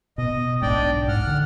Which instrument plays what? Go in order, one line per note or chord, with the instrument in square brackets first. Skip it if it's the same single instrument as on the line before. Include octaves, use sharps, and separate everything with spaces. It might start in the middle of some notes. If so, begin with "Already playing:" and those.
[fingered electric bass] B2 [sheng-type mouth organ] D#5
[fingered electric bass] B1 G#2 [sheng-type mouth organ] D4 D5 G5
[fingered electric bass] G#2 [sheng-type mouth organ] F#5 F6
[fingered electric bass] D3